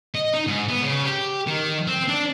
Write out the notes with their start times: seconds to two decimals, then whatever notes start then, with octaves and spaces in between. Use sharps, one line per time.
0.15 D#5
0.33 D#4
0.47 G#2
0.68 B3
0.82 C#3
1.04 G4
1.47 D#3
1.87 C4
2.08 D4